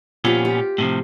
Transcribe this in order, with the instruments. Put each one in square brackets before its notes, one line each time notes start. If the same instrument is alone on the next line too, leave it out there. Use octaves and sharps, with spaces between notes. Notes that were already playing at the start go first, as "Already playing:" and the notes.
[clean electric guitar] A#2 B3 C#4 [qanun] F3 F4 G4
[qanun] G4
[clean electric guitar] A2 C3 F3